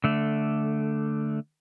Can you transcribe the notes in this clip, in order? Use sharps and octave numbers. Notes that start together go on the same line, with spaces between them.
D3 A3